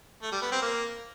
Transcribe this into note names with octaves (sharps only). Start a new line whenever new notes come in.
A3
G3
B3
C4
A#3